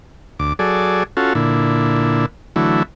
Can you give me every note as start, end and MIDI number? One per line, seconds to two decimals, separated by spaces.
0.40 0.53 38
0.40 0.53 86
0.59 1.03 54
0.59 1.03 68
0.59 1.03 69
0.59 1.03 74
1.17 1.33 61
1.17 1.33 65
1.17 1.33 66
1.17 1.33 69
1.35 2.26 46
1.35 2.26 50
1.35 2.26 64
2.56 2.83 50
2.56 2.83 52
2.56 2.83 54
2.56 2.83 57
2.56 2.83 64